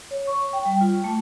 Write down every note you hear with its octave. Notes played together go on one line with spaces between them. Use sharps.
C#5
C#6
G5
G3
F4
A3